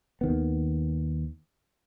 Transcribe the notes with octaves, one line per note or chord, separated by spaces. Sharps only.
D#2 D#3 B3